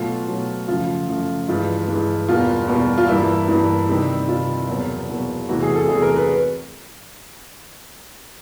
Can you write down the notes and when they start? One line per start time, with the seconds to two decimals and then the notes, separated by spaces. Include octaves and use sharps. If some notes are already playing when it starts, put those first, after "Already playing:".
Already playing: B2 F#3 A3 F4
0.28 B2 F#3 A3
0.68 F#2 C#3 F3 A3 F4
1.08 F#2 C#3 F3 A3
1.48 G2 E3 G#3 F4
1.88 G2 E3 G#3
2.29 E2 B2 G3 A#3 F4
2.68 E2 B2 G3 A#3
2.98 F4
3.08 G2 E3 G3 A#3 E4
3.48 G2 E3 G3 A#3
3.89 C3 D#3 G3
4.28 C3 D#3 G3 F4
4.68 E2 B2 F#3 A#3
5.09 E2 B2 F#3 A#3
5.49 E2 C3 E3 A3 F#4
5.63 G#4
5.75 A4
5.88 E2 C3 E3 A3 G#4
6.02 A#4
6.16 B4